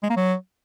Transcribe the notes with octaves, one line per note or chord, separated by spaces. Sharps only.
G#3
A#3
F#3